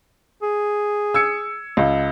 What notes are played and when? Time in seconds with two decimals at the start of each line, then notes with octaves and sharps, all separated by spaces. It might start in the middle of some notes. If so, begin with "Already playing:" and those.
0.42 G#4
1.14 E6 G#6 C#7
1.77 C#2